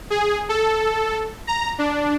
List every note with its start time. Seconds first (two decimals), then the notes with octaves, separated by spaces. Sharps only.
0.10 G#4
0.49 A4
1.47 A#5
1.79 D4